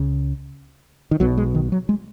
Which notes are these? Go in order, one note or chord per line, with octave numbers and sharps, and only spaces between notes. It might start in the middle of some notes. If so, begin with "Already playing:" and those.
Already playing: C#2 C#3
D#3
B1 B2 F#3
G#3
D#3
F#3
G#3